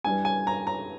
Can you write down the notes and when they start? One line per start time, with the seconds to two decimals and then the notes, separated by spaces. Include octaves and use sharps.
0.04 G2 E3 G3 G#5
0.25 G#5
0.47 A#5
0.67 A#5